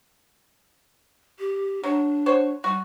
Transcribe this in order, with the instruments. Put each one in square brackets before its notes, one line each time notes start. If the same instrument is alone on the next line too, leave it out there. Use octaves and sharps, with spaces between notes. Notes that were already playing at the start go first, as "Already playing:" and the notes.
[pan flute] G4
[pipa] F#3 [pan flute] D4
[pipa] F#4 C5 C#5
[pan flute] G3 [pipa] F#4